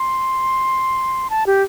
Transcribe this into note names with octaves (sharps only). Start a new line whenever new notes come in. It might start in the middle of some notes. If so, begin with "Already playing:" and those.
Already playing: C6
A5
G4